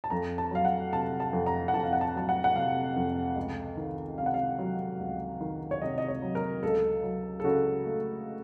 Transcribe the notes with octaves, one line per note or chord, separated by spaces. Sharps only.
A5
F2 A#5
A5
F#3 F5
F#5
C3 A5
A5
F2
A#5
F#5
F2 A5
F5
F#5
A5
F#3 A5
F#5
F#5
C3 F5
F2
C#2
D#3
C3 F5
F#5
F5
F#3
C#2
D#3
C#5
C3 D#5
D#5
C#5
F#3
A#4
C#2 A4
F#3
A4
C#3 F#4
A3